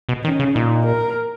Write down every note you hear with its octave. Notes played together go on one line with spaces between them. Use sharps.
B2
D#3 C#4
C#3
A#2 D#4
A#4